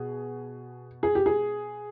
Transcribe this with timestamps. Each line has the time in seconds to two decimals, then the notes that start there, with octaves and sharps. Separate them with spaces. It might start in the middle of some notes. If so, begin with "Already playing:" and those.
Already playing: B2 G#4
1.03 G#4
1.15 G4
1.26 G#4